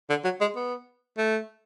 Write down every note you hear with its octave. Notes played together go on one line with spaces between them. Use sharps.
D3
F#3
G#3
B3
A3